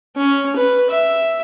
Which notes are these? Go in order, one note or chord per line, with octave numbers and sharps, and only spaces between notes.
C#4
B4
E5